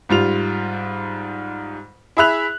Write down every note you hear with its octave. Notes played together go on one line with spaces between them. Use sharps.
G#2 G3 F4 F7
E4 G#4 E5 B5 F#6 F7